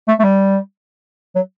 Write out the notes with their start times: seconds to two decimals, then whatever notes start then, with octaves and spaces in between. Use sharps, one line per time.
0.08 A3
0.19 A3
0.23 G3
1.35 F#3